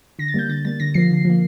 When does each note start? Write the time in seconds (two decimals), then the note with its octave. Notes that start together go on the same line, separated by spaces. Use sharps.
0.19 D3 A#6
0.28 A6
0.34 G3 A#3 G6
0.49 D3 A6
0.65 G3 A#3 A6
0.80 D3 A#6
0.94 F3 A#3 C7
1.11 D3
1.25 F3 A#3